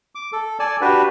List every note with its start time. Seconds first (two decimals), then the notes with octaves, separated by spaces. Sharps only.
0.15 D6
0.33 A4
0.60 A4 D5 G#5 A5
0.81 D4 F#4 G4 B4